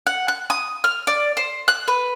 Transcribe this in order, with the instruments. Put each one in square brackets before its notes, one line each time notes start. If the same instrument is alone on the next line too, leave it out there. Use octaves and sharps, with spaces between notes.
[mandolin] F#5
F#6
D#6
F6
D5
C5
F#6
B4